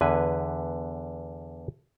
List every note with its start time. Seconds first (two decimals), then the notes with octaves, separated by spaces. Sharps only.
0.01 E2 D3 B4 G#5